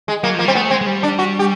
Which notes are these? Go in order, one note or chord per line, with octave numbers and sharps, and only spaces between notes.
G#3
F#3 A#3
F3 A#3
G3 C4
A3 B3
G#3 C4
G#3
G3
D4
F#4
G4